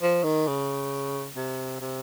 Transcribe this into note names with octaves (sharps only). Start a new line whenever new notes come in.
F3
D#3
C#3
C3
C3